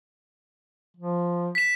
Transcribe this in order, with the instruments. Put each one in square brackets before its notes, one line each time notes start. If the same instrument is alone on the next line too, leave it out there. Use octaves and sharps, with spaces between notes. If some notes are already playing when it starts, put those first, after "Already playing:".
[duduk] F3
[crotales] B6 E7